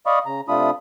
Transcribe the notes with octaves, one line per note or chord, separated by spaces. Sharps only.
D5 D#5 F5 B5 C#6 D#6
C#3 A#5
C3 A3 D4 F4 B5 D#6